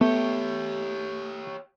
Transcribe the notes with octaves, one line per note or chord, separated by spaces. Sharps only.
A3 B3 G4 C#5